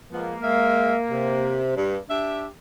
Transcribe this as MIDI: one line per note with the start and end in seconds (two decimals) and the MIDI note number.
0.12 0.35 53
0.12 0.35 56
0.12 1.72 58
0.12 0.35 59
0.42 0.94 56
0.42 0.94 76
0.42 0.94 77
1.11 1.74 48
1.76 1.98 43
2.10 2.47 62
2.10 2.47 67
2.10 2.47 76